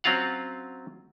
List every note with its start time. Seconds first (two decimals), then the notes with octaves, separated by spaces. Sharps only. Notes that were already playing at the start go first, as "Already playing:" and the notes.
0.04 F#3 C4 C#4 F4 F5 F#5